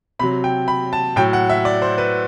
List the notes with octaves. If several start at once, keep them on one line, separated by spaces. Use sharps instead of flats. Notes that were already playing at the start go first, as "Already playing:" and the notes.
C3 F#3 B5
G5
B5
A5
A2 F#3 G5
F#5
E5
D5
C5
B4